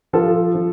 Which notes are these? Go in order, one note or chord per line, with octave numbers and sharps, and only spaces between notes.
F3 F4 A4
F3